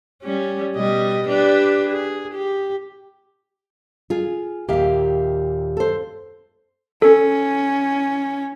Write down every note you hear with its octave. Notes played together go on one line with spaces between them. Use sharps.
G3 C#4
B2 G3 D#5
D4 G4 B4
G#4
G4
F4 G#4
D#2 A#2 G4 E5 F5
A4 C5
C#4 A4